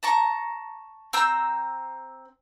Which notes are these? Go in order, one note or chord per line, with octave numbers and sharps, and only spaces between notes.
A5 A#5 C#6
C4 A#5 E6 G6